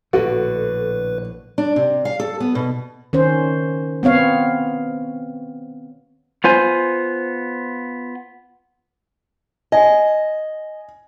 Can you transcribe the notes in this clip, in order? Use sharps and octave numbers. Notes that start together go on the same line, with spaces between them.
A#1 A2 D3 F#4 A4 B4
D4
C3
F5
A4
B3
B2
D#3 C#4 C5
B3 C4 C#5 F5
B3 F4 C5 G#5
D#5 G#5